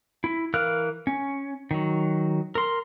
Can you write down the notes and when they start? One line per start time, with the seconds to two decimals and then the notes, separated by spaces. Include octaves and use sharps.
0.24 E4
0.54 E3 A#4 F5 F6 F#6
1.07 C#4
1.71 D#3 F#3
2.55 A#4 C6